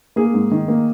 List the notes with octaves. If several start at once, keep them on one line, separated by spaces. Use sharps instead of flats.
A#3 G#4
G#2
D#3
A#3